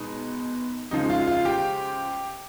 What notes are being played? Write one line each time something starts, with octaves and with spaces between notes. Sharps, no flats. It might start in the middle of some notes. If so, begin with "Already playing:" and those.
Already playing: B2 G#3 D#4
C#3 F3 G#3 D#4
F4
F4
G4